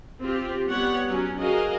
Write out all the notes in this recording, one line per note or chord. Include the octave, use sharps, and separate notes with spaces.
C4 F4 G4
G3 B3 G4 C#5 F#5
F#3 C#4
F#4 G#4 A#4 D#5 F5